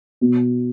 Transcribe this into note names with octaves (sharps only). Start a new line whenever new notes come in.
B2